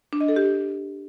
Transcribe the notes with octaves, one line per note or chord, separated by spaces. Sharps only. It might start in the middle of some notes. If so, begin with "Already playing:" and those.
D4
D#5
A4
G4